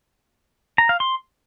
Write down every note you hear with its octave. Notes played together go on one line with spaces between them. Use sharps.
A#5
F5
C6